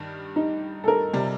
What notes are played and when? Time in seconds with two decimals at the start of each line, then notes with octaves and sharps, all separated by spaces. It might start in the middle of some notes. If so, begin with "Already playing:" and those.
Already playing: G2 D#3 G3
0.36 D#4
0.84 A4
0.88 A#4
1.14 C3 G3